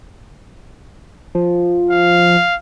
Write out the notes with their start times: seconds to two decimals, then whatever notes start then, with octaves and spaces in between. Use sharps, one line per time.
1.35 F3
1.91 F5